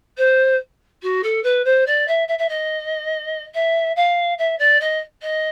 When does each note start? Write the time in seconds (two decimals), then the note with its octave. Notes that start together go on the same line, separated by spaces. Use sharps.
0.17 C5
1.02 F#4
1.23 A4
1.43 B4
1.65 C5
1.86 D5
2.07 E5
2.28 E5
2.38 E5
2.48 D#5
3.54 E5
3.96 F5
4.38 E5
4.59 D5
4.80 D#5
5.22 D#5